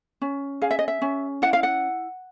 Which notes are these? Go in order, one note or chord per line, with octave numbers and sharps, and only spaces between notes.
C#4
G#4 F5
E5
D#5
E5
C#4
E4 F#5
F5
F#5